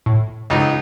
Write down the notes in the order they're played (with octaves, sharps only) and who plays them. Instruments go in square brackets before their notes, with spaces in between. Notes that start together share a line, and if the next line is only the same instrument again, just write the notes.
[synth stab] A2
[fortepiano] C#2 D#4